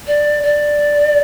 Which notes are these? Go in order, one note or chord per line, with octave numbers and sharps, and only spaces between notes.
D5
D5